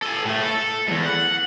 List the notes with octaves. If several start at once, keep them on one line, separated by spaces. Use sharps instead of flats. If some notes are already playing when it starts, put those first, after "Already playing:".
A4 G#5
A2 A3
A4
E2 G#2
F#5